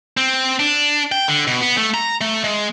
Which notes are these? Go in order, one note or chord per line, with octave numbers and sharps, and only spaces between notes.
C4
D4
G5
D3
B2
B3
A3
A#5
A3
G#3